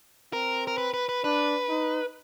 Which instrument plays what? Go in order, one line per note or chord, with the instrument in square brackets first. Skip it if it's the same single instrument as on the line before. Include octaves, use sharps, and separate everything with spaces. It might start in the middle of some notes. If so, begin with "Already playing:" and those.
[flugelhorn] C4 [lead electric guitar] A#4
[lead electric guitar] A#4
B4
B4
B4
[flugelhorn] D4 [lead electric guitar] B4
[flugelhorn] D#4